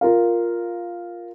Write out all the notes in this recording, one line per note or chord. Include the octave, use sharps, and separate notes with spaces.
F4 A#4 F5